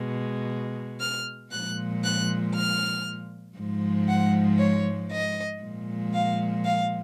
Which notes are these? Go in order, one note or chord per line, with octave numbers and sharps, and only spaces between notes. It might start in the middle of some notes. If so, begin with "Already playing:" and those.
Already playing: B2 G#3
F6
A#2 F3 G#3 F#6
F#6
F6
G#2 F3 G#3
F#5
C#5
D#5
A#2 F3 G#3
F5
F5